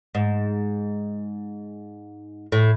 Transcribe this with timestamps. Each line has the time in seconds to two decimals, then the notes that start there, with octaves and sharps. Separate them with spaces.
0.15 G#2
2.52 A2